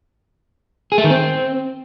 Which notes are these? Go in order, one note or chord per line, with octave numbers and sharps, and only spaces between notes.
G#4
A3
D#3
C4